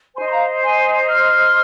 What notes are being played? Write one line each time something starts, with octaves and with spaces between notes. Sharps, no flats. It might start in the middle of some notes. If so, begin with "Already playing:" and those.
D#4 C5 G#5 C6
C6
F5 A#5
G#5 C6
C6 F6